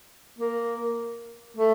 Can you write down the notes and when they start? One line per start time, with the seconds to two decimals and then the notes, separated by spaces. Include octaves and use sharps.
0.39 A#3
1.57 A3